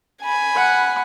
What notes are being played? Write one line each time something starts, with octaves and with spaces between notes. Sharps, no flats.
G#5 B5
F#5